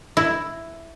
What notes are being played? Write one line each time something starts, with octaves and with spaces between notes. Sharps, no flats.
E4